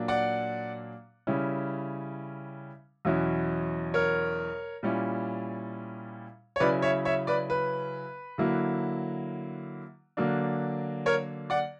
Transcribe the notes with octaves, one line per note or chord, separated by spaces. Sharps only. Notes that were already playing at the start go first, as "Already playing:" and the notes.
Already playing: A#2 F#3 A#3 D4
D5 F#5
C#3 G3 C#4 E4
E2 B2 F#3 C#4 E4
A#4 C#5
A#2 G3 C#4 E4
C#5
C#3 F#3 C#4 E4 B4 D5
C#5 E5
C#5 E5
B4 D5
B4
D3 F#3 A#3 E4
D3 F#3 A#3 D4
A#4 C#5
D5 F#5